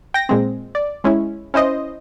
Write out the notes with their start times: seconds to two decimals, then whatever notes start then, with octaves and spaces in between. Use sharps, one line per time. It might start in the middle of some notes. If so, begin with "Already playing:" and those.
0.14 G5 A#6
0.29 A#2 G#3 C4
0.75 D5
1.04 G#3 C#4 E4
1.54 C#4 E4 C5 D#5